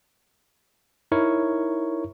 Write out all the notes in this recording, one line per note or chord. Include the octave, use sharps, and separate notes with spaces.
D#4 E4 A#4 C#5 C#6